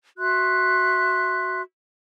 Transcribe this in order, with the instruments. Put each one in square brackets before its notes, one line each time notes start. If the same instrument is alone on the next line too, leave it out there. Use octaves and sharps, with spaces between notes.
[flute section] F#4 E5 C6 F#6